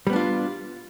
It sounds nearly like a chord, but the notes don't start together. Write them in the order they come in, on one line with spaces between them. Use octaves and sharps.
G3 B3 D4 F4